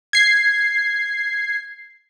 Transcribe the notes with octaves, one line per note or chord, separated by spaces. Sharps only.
G#6 C7